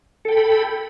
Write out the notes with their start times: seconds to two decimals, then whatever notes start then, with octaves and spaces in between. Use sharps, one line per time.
0.25 A4
0.28 G5
0.32 B5